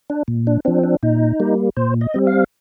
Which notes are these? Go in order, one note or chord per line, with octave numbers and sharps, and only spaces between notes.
D4
A#2
D4
F3 C4 D4
D4
A#2 D#4
G3 A#3
A#2 C5
D#5
G3 C4
F5